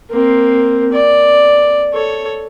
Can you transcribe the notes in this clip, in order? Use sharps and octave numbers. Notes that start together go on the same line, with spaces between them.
A#3 C4
D5
A4 C#5